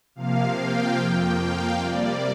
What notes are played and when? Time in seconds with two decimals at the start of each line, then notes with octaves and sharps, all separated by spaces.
0.15 C3 F3 A#3 F5
0.57 G5
0.97 F2 F3 A#3
1.39 F5
1.80 C3 G3 A#3 D5